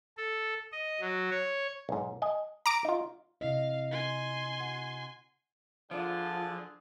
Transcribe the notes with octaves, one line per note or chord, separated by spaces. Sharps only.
A4
D#5
F#3
C#5
B1 G#2
D#5 G#5
A#5 D6 D7
D#4 F4
C3 E4 D#5 F5
G#5 C6
F#5
D3 F3 D4 F4 G#4